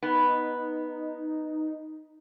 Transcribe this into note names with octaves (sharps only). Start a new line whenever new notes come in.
B3 D#4